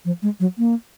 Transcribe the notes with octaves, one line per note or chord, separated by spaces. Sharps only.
F3
G#3
F#3
A#3